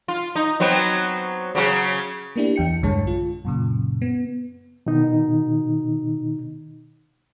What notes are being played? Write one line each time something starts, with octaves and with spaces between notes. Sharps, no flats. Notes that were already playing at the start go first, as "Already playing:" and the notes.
F4
D#4
F#3 B3 C4
C#3 F#3 C#4
A#3 B3 D4 E4 G4
E2 G5 C#7
B1 G2 D3 G#3 C#5 A5
F4
F#2 A#2 C#3
B3
B2 D#3 D#4